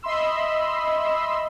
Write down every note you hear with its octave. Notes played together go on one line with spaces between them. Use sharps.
D#5 E5 B5 C6 E6